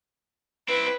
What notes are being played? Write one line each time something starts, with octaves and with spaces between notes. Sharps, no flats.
C4 E4 B4